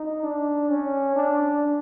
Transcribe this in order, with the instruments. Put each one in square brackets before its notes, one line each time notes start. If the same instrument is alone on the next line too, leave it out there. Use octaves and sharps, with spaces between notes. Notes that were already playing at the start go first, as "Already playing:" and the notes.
Already playing: [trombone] D#4
D4
C#4
D4